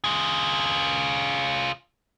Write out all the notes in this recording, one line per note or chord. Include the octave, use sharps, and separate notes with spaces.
F4 G#4